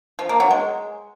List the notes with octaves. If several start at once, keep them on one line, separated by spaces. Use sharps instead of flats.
F3
A#3
F#3
G#3